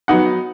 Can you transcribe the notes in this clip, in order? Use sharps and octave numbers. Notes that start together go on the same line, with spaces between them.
F#3 B3 D#4 F#5